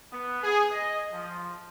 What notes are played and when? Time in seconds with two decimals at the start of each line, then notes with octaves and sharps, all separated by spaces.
0.11 B3
0.43 G#4
0.72 D#5
1.13 F3